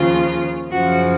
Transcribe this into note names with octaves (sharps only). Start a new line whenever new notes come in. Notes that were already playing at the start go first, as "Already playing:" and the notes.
Already playing: D#2 C#3 F3 F4
F#2 C#3 F3 F#4